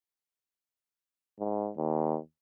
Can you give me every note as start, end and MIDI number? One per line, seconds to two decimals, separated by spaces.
1.39 1.70 44
1.77 2.18 39